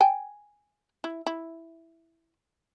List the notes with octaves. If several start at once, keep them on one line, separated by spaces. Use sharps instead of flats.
G5 G#5
E4
E4